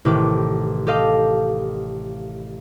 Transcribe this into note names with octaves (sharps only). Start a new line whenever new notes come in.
A1 C3 D#3 G4 B4 D6
G4 A4 D#5 F5 D6